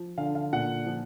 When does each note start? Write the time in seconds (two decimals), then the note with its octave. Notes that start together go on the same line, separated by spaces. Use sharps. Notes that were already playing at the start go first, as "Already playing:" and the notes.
Already playing: F3
0.18 D3 F5
0.35 F5
0.53 A#2 F#5
0.86 F3